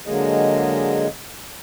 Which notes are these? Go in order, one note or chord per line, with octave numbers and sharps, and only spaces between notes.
D3 F#3 G#3 A#3 G#4 D#5